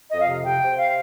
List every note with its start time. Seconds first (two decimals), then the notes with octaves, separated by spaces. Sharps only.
0.10 F2 D#5
0.21 F5
0.27 C3
0.44 C3 G5
0.61 C3
0.78 F5